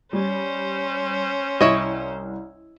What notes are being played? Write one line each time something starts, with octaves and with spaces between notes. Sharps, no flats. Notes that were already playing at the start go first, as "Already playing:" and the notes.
G3 C#4 C5
C2 E4 C#5 D#5